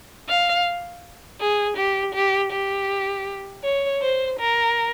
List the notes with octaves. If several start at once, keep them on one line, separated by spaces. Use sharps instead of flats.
F5
G#4
G4
G4
G4
C#5
C5
A#4